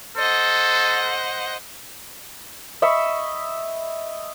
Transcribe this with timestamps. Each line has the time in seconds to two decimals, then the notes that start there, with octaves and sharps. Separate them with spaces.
0.17 A4 C5 D#5 F#5
2.82 D#5 E5 B5 C#6